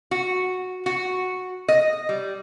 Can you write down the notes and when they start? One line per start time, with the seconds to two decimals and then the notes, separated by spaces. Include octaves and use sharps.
0.11 F#4
0.86 F#4
1.68 D#5
2.09 G3